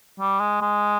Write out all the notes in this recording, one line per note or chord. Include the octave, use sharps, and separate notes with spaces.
G3
G#3
G#3